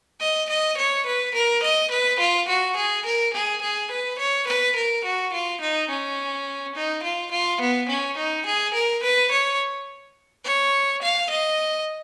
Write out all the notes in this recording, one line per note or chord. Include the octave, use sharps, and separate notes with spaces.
D#5
D#5
C#5
B4
A#4
D#5
B4
F4
F#4
G#4
A#4
G#4
G#4
B4
C#5
B4
A#4
F#4
F4
D#4
C#4
D#4
F4
F4
B3
C#4
D#4
G#4
A#4
B4
C#5
C#5
F5
D#5